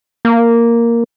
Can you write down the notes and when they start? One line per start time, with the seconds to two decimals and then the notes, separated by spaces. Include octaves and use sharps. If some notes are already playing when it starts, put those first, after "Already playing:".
0.25 A#3